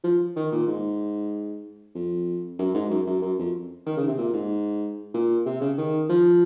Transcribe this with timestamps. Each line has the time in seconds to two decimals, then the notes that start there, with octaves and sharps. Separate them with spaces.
0.04 F3
0.36 D#3
0.51 A#2
0.67 G#2
1.95 F2
2.58 F#2
2.74 G#2
2.90 F#2
3.07 F#2
3.22 F#2
3.38 F2
3.86 D#3
3.97 C#3
4.07 C3
4.18 A#2
4.33 G#2
5.14 A#2
5.45 C3
5.61 C#3
5.77 D#3
6.09 F3